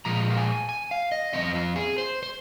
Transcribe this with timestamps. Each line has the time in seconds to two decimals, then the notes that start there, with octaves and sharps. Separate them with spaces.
0.05 A#2 F3 G#3 A#5
0.30 F5
0.37 G#5
0.69 G#5
0.91 F5
1.12 D#5
1.33 D#3 C4 D#5
1.38 F2
1.55 F4
1.76 G#4
1.98 C5
2.23 C5